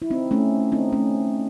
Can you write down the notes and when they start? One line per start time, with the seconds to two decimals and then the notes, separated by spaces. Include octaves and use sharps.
0.02 E4
0.10 C4 D#4
0.31 A3 C#4
0.72 C4 D#4
0.92 A3 C#4